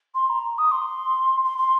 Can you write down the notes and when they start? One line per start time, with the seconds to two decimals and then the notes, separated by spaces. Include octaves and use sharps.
0.14 C6
0.29 A#5
0.58 D#6
0.71 C6
1.44 C6
1.58 C6